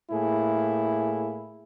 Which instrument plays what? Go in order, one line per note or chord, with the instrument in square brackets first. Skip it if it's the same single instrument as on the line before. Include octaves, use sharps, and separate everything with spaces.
[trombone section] A2 A#3 E4 G#4